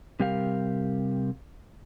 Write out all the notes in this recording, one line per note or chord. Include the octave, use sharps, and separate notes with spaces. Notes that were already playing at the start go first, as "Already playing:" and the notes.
C3 G3 G4 A#4 F5